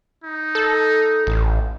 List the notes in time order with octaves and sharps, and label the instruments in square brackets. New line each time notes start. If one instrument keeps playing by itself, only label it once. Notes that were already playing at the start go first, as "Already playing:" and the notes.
[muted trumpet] D#4
[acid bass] A4
A1